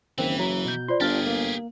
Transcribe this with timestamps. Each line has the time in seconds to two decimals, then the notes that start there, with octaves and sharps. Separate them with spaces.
0.18 F#1 D#3 E3 C4
0.39 F#3 A#5
0.65 B2 G6
0.88 F4 C5 D5 C6
1.01 G1 D4 F4 G4 G#4 F6 A6
1.27 A#3